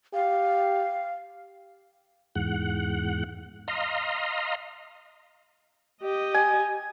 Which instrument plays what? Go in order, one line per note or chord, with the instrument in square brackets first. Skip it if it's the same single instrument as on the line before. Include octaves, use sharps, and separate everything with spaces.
[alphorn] G4 [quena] F5
[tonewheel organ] E2 G#2 F#5
D#5 F5 A#5 C6
[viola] G4 D#5
[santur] G#5